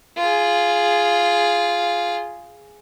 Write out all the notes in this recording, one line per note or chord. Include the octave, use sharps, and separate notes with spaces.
F4 G#4